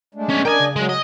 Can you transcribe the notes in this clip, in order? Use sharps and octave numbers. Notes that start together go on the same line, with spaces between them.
G#3 A3 D4
B3 C#4
D4 A#4 D5 D#5 G5 G#5
C#3
F#3 G#3
D#5